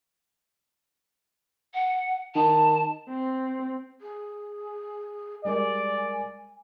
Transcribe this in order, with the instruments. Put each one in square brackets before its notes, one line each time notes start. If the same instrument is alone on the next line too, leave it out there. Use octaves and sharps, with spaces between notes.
[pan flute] F#5
[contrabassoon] D#3 [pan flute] A5
[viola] C4
[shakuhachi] G#4
[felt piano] G3 G#3 A#4 [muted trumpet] D5 [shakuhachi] G#5